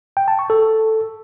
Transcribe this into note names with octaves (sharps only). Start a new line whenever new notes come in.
G5
A5
C#6
A4